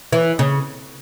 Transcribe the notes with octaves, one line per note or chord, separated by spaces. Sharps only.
E3
C#3